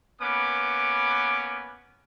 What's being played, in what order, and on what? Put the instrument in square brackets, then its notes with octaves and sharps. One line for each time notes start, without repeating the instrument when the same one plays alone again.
[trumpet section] A#3 B3 C#4 B4 D6